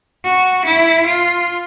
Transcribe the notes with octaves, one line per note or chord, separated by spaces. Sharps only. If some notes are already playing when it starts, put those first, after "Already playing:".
F#4
E4
F4